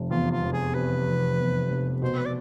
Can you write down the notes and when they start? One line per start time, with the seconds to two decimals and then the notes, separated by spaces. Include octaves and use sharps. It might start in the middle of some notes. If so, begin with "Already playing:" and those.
Already playing: F1 C3
0.10 E2 F4
0.31 F4
0.42 F1
0.53 G#4
0.74 C3 B4
1.07 F1
1.37 E2
1.70 F1
2.02 B2 C5
2.17 B4
2.25 D5